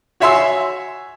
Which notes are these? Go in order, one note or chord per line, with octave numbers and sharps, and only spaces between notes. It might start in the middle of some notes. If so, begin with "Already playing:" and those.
F#4 C#5 E5 G#5 C6 E6